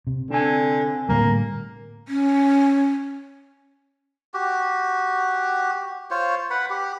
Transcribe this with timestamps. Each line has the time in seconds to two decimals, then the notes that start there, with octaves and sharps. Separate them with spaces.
0.07 C3
0.30 D3 C4 G#5
1.09 A2 D3 G3 A#3
2.08 C#4
4.34 F#4 G4
6.11 F4 C5 C#5
6.50 B4 F#5 B5
6.70 G4